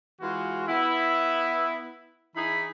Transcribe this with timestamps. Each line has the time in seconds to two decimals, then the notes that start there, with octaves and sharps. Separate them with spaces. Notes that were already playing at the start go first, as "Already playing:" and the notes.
0.21 E3 G#3 B3 F4 F#4
0.68 B3 E4
2.36 E3 D#4 E4 G#4 B5